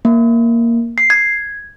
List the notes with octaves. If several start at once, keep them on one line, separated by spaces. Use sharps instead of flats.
A#3
C7
G#6